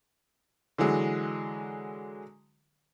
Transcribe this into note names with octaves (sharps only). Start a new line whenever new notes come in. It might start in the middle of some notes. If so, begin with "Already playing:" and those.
D3 E3 F#3 G#3